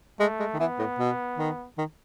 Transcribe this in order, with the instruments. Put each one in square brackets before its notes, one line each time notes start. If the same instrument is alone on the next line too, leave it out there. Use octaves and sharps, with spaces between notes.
[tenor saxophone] G#3 [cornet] A3
[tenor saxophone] G#3
D#3
[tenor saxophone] E3 [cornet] B3
[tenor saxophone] A2
B2
D#3
D#3